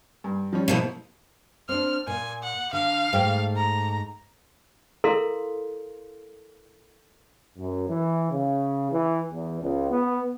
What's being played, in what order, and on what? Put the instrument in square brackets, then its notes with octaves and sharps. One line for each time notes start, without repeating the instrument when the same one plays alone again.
[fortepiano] G2
F3 G3 C#4
[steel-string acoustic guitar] B2 F3 B3 [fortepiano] A#3 E4
[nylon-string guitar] C4 D4 [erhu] F6
[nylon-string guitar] A#2 [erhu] G#5
[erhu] F#5
[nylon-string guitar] D3 [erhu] F5
[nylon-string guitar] G#2 A3 G5
[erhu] A#5
[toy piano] E4 A4 A#4 F5 C6
[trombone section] F#2
E3
C#3
E3
E2
C#2
B3